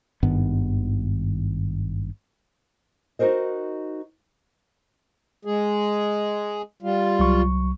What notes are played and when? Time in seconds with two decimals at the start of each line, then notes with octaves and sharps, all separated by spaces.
0.23 G#1 G2 D#3 B3
3.19 D#4 F#4 A#4 C5 D#5
5.45 G#3 G#4
6.82 G3 F4
7.19 C2 F#3 C#6